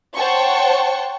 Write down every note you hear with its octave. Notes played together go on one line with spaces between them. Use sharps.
C5 C#5 F#5 G5 A5 C#6